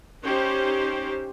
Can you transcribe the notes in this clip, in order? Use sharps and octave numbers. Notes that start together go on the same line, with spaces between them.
C#4 D#4 G4 C5